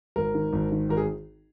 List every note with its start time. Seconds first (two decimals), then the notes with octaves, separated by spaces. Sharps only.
0.16 G#1 A#4
0.35 D#3
0.53 G#1
0.72 D#3
0.89 G#1 A#4
0.97 G#4